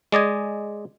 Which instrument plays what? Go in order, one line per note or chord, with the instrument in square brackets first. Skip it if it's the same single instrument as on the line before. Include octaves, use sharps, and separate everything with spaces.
[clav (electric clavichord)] G#3 D5 D#5 G#5